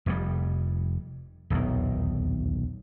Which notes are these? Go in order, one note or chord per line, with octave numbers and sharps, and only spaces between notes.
F1 F2 A#2 G3
D#1 B1 E2 D#3